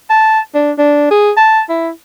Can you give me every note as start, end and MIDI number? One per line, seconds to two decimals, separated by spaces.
0.10 0.40 81
0.54 0.72 62
0.78 1.08 62
1.11 1.31 68
1.37 1.61 81
1.69 1.90 64